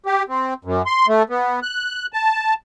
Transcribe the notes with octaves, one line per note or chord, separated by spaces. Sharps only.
G4
C4
F#2
C6
A3
B3
F#6
A5